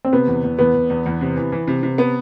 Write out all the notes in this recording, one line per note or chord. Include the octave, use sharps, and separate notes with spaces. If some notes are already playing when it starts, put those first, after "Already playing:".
C4
C3 B3
E2
E2
E2 B3
E2
E2
E2
C3
E3
E3
C3
C3
B3